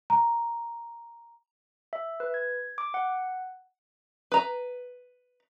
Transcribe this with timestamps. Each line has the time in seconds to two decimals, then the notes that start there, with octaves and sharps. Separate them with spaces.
0.10 A#5
1.93 E5
2.20 B4
2.34 G#6
2.78 D6
2.94 F#5
4.32 B4 A#5